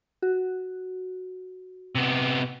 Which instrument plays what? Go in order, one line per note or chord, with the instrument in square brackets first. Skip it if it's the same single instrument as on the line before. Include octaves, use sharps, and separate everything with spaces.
[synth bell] F#4
[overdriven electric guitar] C3 B3